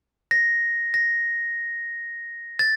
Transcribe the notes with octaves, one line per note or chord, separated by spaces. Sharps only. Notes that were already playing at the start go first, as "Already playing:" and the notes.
A#6
A#6
A6